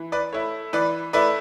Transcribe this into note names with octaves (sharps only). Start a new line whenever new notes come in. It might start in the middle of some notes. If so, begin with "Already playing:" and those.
Already playing: E3
B4 D5
A3 E4 C#5
E3 B4 D5
A3 E4 B4 D5